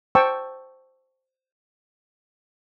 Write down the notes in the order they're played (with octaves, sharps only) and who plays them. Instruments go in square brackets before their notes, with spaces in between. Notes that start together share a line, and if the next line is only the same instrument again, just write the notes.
[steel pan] C5 G5 A5 C#6 E6